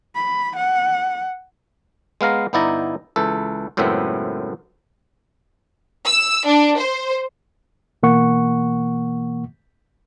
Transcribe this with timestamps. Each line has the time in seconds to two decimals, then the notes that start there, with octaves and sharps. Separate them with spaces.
0.15 B5
0.56 F#5
2.21 G#3 B3 F5 A#5
2.53 G1 B3 D#4 E4 D5 A#5
3.16 C#2 E3 A4
3.77 C#2 F#2 A2 B3 C4 E5
6.07 E6
6.46 D4
6.79 C5
8.03 B2 E3 A#3 F#5 C#6